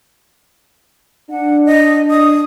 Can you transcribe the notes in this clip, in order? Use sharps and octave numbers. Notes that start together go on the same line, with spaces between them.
D4 F#5
D#5
D#6